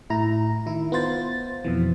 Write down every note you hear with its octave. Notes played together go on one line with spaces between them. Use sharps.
A2 E4 A#5
D#3 E4
B3 F4 C5 A6
F2 B2 E3